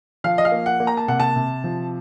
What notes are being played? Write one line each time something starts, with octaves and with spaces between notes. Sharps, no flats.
F3 F5
D#5
F5
A#3
F#5
A#3
A#5
A5
C3 F#5
A5
C3
F3